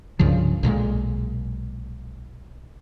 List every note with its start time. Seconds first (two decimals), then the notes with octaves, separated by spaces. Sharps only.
0.19 C2 G2 C#3 F3
0.63 B1 A#2 F#3 G#3